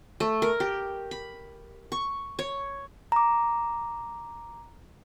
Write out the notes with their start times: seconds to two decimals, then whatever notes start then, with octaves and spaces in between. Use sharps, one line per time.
0.20 A3
0.42 A#4
0.60 G4
1.11 B5
1.92 C#6
2.39 C#5
3.12 A#5 D6